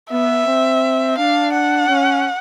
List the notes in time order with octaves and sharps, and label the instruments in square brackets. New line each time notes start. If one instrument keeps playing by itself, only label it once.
[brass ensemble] B3 [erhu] E5
[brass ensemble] C4
[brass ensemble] D4 [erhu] F5
[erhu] F#5
[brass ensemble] C#4